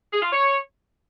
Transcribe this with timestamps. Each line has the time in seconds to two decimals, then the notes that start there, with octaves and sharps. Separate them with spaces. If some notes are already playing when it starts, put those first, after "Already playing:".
0.13 G#4
0.22 F4
0.32 C#5